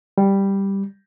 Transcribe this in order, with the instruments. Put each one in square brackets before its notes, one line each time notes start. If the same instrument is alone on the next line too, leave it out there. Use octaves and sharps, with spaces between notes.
[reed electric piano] G3